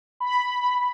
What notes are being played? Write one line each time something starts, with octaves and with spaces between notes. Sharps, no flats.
B5